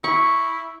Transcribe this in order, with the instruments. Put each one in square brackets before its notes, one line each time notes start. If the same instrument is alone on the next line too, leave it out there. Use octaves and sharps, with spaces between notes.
[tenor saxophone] E4 [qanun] C#6